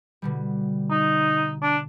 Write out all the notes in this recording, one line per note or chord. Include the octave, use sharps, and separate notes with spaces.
B2 D3 G3
D#4
D4